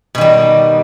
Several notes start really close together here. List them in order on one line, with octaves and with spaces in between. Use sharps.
B2 D#3 G3